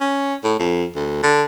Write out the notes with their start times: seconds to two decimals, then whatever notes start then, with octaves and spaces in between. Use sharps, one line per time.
0.01 C#4
0.44 A2
0.59 F2
0.95 D2
1.23 D3